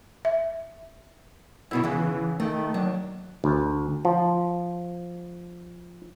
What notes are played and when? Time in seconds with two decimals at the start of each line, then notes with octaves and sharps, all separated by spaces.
0.25 E5
1.71 F#2 B2 D#3 E4
1.84 E2 C#3 E3
2.40 D#3 A3
2.74 D#2 F#3 D4
3.44 D2
4.05 F3